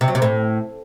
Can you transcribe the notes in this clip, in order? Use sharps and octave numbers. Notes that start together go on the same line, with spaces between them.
C3
F#3
C3
A2